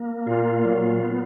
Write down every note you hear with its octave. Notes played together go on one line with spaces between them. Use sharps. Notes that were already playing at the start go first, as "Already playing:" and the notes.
Already playing: A#3
A#2 F4
A#2 F#3
B3